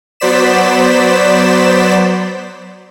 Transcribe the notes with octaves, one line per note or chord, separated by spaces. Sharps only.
F#3 B3 C5 D5 B6 E7